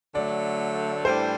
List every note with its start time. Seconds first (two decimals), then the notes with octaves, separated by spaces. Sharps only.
0.15 D3 F#3 A3 D5
1.05 A2 E3 G3 D4 A4 C5